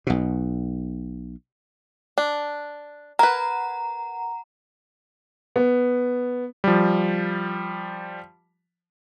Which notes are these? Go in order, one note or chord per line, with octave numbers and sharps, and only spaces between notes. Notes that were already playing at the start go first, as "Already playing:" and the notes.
B1 B2
D4
A#4 B4 F#5 A#5
B3
F3 G3